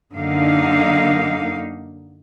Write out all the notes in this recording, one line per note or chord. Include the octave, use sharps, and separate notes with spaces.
F#2 D3 A#3 D#4 F5